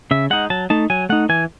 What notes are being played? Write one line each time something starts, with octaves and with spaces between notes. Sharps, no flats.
C#3 E5
G#3 D#4 F#5
F#3 A5
A3 D#4 A5
F#3 G#5
A3 D#4 F#5
E3 G#5